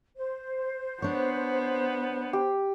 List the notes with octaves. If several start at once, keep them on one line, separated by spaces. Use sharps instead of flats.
C5
B3 D4 C#5
G4